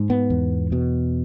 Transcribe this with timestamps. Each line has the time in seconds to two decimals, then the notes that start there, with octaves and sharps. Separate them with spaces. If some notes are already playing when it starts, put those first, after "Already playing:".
Already playing: G#2
0.10 B3
0.30 E2
0.72 B2